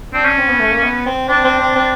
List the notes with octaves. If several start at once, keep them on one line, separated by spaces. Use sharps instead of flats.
C4 D4
C#4
C4
B3
A3
A#3
B3
C4
C4 D4
C4
C4
C4